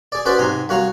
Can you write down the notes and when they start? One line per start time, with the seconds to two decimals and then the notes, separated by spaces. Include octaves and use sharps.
0.12 G#4 D5
0.25 C#4 F#4 G#4 B4 C5 D5
0.39 G#2 C3 G#5 A#5 C6
0.69 C2 F#4 C#5 F5 A#5